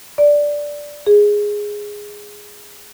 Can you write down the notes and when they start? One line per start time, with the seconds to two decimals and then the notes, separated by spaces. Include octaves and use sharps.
0.18 D5
1.07 G#4